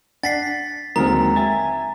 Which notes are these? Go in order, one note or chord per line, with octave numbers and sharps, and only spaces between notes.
D4 F#5 A6 B6 C7
D#2 D3 F#3 G#3 C4 D#4 A#4 A#5
E5 G#5 A6